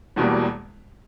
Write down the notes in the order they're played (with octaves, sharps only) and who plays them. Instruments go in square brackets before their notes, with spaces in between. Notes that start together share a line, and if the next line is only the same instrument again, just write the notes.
[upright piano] E1 E2 B2 G3 A#3